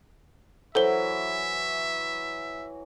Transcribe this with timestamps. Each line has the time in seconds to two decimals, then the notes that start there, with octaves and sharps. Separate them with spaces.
0.75 E3 F#3 A4 C5 E5 G7